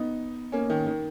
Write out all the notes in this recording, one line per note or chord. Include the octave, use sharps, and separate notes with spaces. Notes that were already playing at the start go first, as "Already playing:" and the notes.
Already playing: B3 D#4
A#3 C#4
D#3
D#3